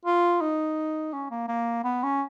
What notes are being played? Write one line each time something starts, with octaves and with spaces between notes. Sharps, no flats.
F4
D#4
C#4
A#3
A#3
B3
C#4